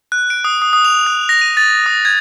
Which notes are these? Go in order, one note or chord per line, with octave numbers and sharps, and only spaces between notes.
F#6
D7
D#6
D#6
D#6
F7
F#6
A#6
D#7
A6
D#6
G#6